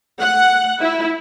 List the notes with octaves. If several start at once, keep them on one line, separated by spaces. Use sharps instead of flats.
F#5
E4